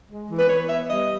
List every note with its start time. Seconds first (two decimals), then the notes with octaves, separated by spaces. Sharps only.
0.10 G#3
0.30 E3
0.39 B4
0.49 E3 C#5
0.69 B3 E5
0.89 G3 D#5